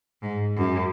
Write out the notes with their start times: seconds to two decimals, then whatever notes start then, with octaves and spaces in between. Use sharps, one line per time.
0.22 G#2
0.57 F#2